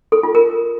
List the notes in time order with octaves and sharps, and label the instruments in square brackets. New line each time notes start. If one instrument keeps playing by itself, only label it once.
[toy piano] A4
F4
A#4